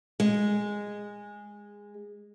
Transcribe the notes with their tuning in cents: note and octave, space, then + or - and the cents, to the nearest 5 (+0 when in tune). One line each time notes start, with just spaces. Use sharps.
G#3 -10